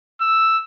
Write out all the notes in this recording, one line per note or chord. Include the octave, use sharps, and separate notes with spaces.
E6